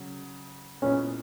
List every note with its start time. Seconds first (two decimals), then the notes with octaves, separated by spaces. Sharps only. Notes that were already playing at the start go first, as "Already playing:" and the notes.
Already playing: C#3 F#3
0.82 A#2 G#3 B3 C#4 E4